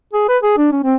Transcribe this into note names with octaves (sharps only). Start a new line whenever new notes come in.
G#4
B4
G#4
D4
C#4
C4